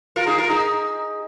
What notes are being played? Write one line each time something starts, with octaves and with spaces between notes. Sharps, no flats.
F4 A#4
D#4 G#4
F4 A#4
D#4 G#4